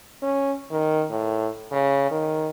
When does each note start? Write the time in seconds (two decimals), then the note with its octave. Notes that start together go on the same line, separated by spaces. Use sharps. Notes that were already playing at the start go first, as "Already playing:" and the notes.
0.22 C#4
0.71 D#3
1.11 A2
1.72 C#3
2.11 D#3